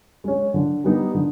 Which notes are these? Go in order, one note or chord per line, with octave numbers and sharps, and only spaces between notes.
G#3 C#4
D3
G3 B3 D#4
D3